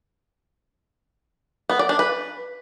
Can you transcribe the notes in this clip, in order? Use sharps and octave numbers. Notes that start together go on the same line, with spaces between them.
B3
D5
D4
B4